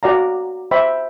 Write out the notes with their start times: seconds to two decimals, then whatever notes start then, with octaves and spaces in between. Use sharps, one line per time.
0.03 F#4 A#4 D5 F5 A#5
0.71 C5 E5 G5 B5